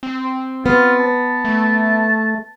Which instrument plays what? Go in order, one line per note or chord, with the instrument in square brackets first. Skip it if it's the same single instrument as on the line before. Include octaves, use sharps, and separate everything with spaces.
[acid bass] C4
[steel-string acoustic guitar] B3 [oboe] F4
[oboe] A5
[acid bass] A3